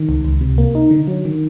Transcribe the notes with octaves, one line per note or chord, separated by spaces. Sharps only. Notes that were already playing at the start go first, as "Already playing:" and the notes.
Already playing: D#3
C#2
C#2
C3
A#3
D#4
D3
F#3
D#3